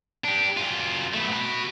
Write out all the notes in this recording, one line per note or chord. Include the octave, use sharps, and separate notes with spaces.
D4 G4
F#2 F4
A3 B3
F#4 B5